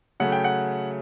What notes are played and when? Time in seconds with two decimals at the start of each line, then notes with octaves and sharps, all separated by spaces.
0.20 C#3 F#3 A3 F#5
0.32 G5
0.44 F#5